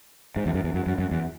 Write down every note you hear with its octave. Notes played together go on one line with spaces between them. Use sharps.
G#2
E2
F#2
E2
F#2
F#2
F#2
E2